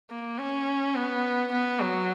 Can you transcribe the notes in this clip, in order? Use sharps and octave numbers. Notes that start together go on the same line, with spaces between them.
A#3
C#4
B3
B3
F#3